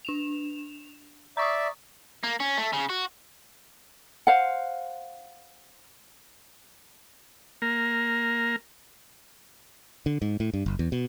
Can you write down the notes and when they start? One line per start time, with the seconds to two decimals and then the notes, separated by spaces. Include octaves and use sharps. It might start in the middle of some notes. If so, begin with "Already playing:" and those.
0.05 D4 E7 F7
1.37 D5 E5 A#5 C#6 D#6
2.23 A#3
2.40 C#4
2.57 A3
2.73 C#3
2.89 F#4
4.27 C5 F5 F#5
7.62 A#3 A#4
10.06 D3
10.22 G#2
10.40 A2
10.54 G2
10.66 F#1
10.79 E2
10.92 B2